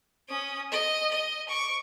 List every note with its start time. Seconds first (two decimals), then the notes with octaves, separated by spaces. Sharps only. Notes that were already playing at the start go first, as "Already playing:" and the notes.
0.28 C#4 D#6
0.72 D#5
1.10 D#5
1.49 C#6 D6